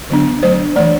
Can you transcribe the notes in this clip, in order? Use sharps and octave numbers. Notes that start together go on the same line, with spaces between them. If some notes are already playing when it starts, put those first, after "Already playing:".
D3 F#3 B3 D4
F#3 A3 D4 C5
E3 A3 D4 D5